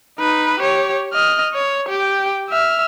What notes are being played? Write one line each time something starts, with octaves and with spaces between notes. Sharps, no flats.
D#4 B4
G4 C#5
D#5 F6
C#5
G4 G5
E5 F6